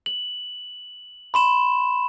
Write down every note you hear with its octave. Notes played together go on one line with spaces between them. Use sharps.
F#7
B5 C6 E7